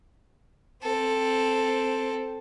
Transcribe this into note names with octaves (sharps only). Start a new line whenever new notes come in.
C4 A4